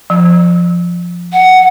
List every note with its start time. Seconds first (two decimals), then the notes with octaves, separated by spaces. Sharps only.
0.10 F3
1.33 F#5